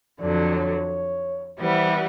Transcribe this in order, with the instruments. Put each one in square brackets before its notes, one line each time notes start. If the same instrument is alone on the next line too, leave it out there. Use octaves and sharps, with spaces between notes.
[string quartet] F2 D3 F#3 [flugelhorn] D5
[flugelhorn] C#5
[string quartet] E3 G3 B3 E4 [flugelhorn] C5